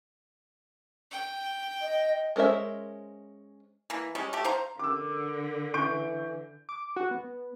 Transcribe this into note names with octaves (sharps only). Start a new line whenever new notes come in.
G5
D#5
G#3 C#4 A#4 C5 E5
E3 A#3
G3 G#3 C#4
A3 G4
C5 F5 A#5
D3 A#4 D6 E6
E3 C#6 G6 D7
D6
F#4
B3